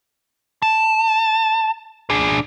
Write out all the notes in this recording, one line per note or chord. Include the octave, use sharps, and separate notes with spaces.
A5
D4 G#4